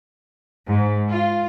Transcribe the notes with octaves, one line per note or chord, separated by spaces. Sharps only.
G#2
F4